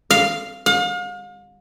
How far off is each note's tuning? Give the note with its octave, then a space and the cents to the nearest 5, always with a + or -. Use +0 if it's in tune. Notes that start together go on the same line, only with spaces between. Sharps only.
F5 -5
F5 +40